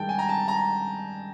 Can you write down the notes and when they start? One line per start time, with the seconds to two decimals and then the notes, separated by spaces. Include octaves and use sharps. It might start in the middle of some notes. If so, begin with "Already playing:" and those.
Already playing: G2 D#3 G#3 G5 A5
0.09 G#5
0.19 A#5
0.29 A5
0.48 A#5